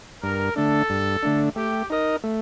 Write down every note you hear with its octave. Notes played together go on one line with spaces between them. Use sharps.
G2 A#4
D3 A3 D4 A4
G2
D3 A3 D4
A3 G4
D#4 A#4 D#5
A3